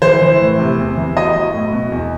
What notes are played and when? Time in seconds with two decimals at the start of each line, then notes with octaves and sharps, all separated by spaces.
0.02 E3 C5
0.22 E3
0.40 A2
0.59 C3
0.78 E2
0.97 E3
1.16 F#3 D#5
1.35 F#3
1.54 A2
1.73 B2
1.92 E2